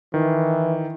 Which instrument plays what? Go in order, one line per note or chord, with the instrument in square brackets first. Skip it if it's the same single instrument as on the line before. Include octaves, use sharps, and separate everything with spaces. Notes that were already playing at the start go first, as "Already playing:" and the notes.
[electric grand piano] D#3 [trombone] E3